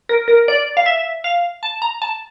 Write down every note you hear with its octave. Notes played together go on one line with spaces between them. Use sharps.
A#4
A#4
D5
F5
E5
F5
A5
A#5
A5